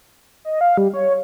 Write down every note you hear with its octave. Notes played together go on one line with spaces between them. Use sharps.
D#5
F5
G3
C#5